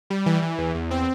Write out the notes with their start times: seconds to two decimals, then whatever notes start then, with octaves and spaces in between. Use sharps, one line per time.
0.10 G3
0.26 E3
0.42 E3
0.58 E2
0.75 E2
0.91 C4